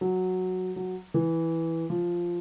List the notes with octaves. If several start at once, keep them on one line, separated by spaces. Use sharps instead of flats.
F#3
F#3
E3
F3